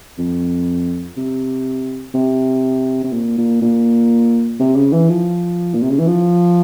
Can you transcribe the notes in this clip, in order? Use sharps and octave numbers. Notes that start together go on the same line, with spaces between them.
F2
C3
C3
C3
A#2
A#2
A#2
C3
C#3
E3
F3
A#2
C3
C#3
E3
F3